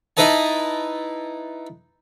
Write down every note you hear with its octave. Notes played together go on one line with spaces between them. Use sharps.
D#4 E4 B4 D#5 A5